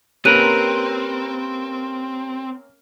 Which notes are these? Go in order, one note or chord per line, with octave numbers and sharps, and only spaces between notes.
A#3 C4 C#4 G4 A#4 B4 F#6 D#7